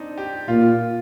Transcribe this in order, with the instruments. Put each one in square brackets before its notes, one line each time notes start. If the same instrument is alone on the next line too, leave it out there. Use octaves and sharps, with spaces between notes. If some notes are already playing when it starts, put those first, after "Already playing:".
Already playing: [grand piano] C4 D4 D#4
G4
[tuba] A#2 [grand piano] F4